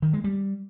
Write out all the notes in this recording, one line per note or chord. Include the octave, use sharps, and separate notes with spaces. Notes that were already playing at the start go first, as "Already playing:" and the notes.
D#3
G#3
G3